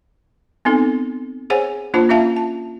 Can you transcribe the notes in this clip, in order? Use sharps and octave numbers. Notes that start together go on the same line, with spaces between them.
B3 C4 D#4 A4
G#4 C5 C#5 F#5 G#5
A#3 D4 F4 C5 A5
C#4 F4 E5 F5 A5
A5